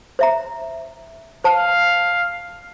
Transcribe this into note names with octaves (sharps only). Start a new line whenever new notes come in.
C5 E5 A#5
C5 F5 A5